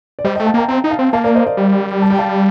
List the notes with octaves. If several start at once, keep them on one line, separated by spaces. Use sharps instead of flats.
D5
G3 C5 D#5
D#5 G5
A3
F5 A5
A#3 G5 A#5
C4 G5 A#5
D#4
F5 A5
C4
A#3 F5 A5
A#4 D5
C5 D#5
D5 F5
G3
A5
G5
F5 A5